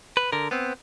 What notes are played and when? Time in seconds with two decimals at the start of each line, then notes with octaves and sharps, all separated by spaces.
0.17 B4
0.32 D3 A#4
0.51 B3 C4